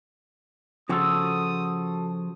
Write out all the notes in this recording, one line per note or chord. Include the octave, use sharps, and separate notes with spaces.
C#3 F3 F#4 A4 D#6